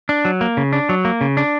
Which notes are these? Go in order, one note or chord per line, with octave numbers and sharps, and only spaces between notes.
D4
F#3
A#3
C#3
D4
F#3
A#3
C#3
D4